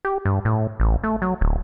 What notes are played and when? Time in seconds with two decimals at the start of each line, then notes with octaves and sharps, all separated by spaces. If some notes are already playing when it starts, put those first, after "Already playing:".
0.05 G4
0.25 G2
0.45 A2
0.80 A1
1.04 A3
1.22 F#3
1.41 D1